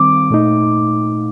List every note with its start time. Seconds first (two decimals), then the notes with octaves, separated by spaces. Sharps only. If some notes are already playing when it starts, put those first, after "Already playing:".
Already playing: D#3 G3 C4 D6
0.30 A#2 A3 D#4